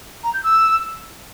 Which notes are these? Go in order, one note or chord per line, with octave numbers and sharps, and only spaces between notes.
A#5
G6
E6